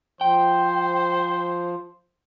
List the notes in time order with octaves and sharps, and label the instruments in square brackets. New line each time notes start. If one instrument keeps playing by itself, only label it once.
[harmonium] F3 [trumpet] C5 [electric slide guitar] G5